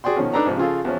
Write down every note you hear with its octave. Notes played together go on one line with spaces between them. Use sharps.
F#4 G#4 D5 G5 C6
B2 D#3 F3 C#4
D4 D#4 A4 B4 D5 A#5
C2 G#2 F3
C#3 F3 F4 G#4 A4
E2 F3 C#4